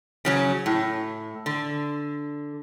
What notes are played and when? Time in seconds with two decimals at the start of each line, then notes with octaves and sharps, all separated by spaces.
0.25 C#3 F#3 C#4
0.66 A2
1.46 D3